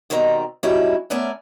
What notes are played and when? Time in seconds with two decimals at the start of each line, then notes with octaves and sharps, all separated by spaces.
0.10 B2 D#3 G3 C4 E5 A#5
0.63 G3 C#4 D#4 E4 F#4 G4
1.10 A3 B3 C#4 A#4 D5 E5